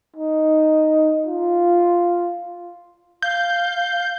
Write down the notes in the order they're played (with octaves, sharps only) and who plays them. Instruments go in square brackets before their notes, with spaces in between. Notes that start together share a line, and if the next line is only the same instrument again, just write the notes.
[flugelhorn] D#4
F4
[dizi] F5 [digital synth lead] G6